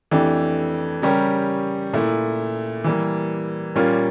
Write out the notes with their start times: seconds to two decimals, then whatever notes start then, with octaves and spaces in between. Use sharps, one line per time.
0.11 F2 E3 A3 D4 G4
1.02 C#3 G3 C#4 G4 A#4
1.93 A#2 A3 E4
2.84 E3 G3 A#3
3.76 A#2 G3 A#3 C#4 F4